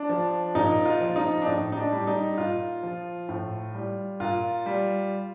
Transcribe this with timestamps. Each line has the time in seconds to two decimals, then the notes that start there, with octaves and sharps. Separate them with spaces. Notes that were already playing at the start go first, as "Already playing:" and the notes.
Already playing: D4
0.09 F3
0.55 A#2 D#4
0.85 F4
1.01 F3
1.16 D#4
1.42 D4
1.46 A2 D#4
1.72 D#4
1.76 D4
1.92 G3
2.07 D#4
2.38 A#2 F4
2.83 F3
3.29 A2
3.75 G3
4.20 A#2 F4
4.66 G3